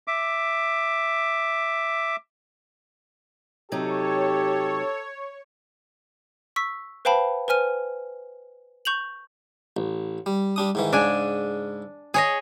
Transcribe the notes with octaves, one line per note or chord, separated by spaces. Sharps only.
E5 D6
C3 F#3 D#4 G4 A4 C#5
C#6 E6 B6
B4 C5 F5 G5 A5 B5
B4 C5 G#5 F6 D#7
C#6 G6 F7 F#7
A1
G3
G3 D4 D#6
G#2 D#3 E3
G#2 C#3 D4 G#5
G#4 C#5 D#5